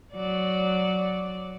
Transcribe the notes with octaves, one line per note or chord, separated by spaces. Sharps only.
F#3 D5